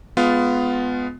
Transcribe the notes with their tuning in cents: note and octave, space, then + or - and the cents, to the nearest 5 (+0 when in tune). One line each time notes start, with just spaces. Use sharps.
G#3 +25 B3 +15 F4 +0